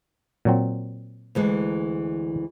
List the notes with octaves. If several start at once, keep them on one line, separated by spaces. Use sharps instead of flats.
A#2 F#3 C4
D2 E3 G#3